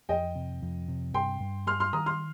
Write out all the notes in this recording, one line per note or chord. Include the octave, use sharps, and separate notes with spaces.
F2 D#5 G5
C3
F2
C3
G2 G5 C6
G2
G3 C6 F6
C6 F6
D#3 A#5 D#6
C6 F6